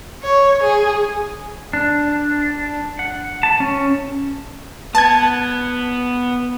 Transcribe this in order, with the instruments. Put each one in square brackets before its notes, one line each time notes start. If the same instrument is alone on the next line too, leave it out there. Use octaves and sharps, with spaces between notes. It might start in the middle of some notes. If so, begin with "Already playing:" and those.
[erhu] C#5
G#4
[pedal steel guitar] D4
F#5
A5
C#4
[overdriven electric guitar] B3 [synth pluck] A5 G#6